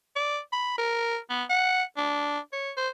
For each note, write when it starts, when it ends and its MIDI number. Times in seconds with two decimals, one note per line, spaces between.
0.16 0.39 74
0.52 0.77 83
0.78 1.17 70
1.30 1.44 59
1.50 1.82 78
1.97 2.39 62
2.53 2.71 73
2.77 2.89 72